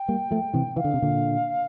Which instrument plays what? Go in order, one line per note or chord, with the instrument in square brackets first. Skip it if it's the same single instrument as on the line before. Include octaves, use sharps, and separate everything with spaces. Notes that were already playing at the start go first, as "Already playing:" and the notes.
Already playing: [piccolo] G5
[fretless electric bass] G3 A#3
F3 A3
C3 E3
[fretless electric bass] E3 [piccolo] F5
[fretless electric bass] D3
C3
A#2 D3